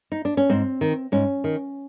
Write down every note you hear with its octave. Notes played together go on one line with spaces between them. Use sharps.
D#4
D4
C#4
G#2 C4
D#3
G#2 C#4
D#3